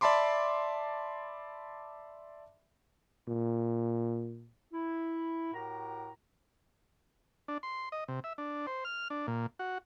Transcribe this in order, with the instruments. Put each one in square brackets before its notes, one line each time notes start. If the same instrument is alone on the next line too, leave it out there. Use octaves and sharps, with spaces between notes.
[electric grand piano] D5 E5 A5 B5 C6 D6
[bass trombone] A#2
[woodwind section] E4
A2 F#4 G4 A#4 A#5
[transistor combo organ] D4
C6
D#5
C3
E5
D4
C5
F6
D4
A#2
F#4